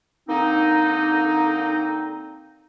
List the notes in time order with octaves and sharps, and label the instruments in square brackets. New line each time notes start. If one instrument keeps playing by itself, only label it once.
[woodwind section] D3 A#3 C4 D#4